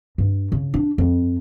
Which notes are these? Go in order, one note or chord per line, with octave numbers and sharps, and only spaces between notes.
G2
C#3
D4
F2